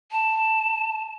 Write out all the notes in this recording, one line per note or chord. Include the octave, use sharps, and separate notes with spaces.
A5